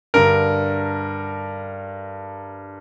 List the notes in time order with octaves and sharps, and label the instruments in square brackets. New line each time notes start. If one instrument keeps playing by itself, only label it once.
[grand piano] G2 D3 A#4